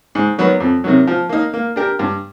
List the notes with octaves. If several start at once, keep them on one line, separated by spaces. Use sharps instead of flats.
G#2
D#3 F#3 B3
F2
C3 D#3 F#3
F3
A#3 D#4
A#3
D4 G4 A#4
G2